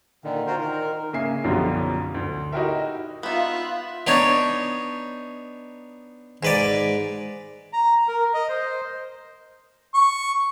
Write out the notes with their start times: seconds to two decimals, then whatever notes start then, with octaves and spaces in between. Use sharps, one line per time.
0.24 A#2 D3 D#3
0.47 F4 F#4 A#4 C5
0.61 D#3 A#4
1.13 C#3 A#3 E5 G#5 C7
1.44 B1 F#2 B2 D3 F3 G3
2.14 D2
2.52 D#4 E4 F#4 G4 A#4 E5
3.23 B3 D#4 F4 E5 F#6
4.07 B3 D4 D#4 C#5
6.43 G#2 B4 D5
7.73 A#5
8.08 A#4
8.34 D#5
8.49 C5
9.94 C#6